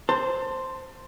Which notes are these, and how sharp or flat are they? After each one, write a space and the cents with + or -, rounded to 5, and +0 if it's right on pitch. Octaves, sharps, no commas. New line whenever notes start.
C5 +0 A5 +30